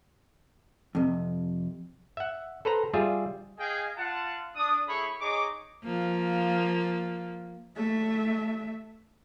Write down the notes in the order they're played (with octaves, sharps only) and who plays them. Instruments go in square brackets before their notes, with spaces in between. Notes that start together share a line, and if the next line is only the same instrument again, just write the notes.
[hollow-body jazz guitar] F2 C3
[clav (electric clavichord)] E5 F#5
A4 B4 C5 A#5
G3 F4 G#4 E5
[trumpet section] G#4 D#5 F5 G5 G#5
F4 F#5 A5
D4 D#6
A3 E4 G#4 C#5 B5 C#6
D#4 G#4 C#5 D#5 D6
[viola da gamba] F3 A#3
[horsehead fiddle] A3 E5